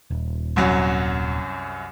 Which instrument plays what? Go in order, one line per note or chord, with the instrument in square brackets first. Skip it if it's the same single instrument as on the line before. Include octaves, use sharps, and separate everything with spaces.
[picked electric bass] D#1
[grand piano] C2 F#2 F#3